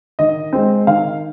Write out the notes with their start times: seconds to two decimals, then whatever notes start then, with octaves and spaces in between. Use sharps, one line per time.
0.19 D#3 D#5
0.53 G#3 C4
0.87 D#3 F5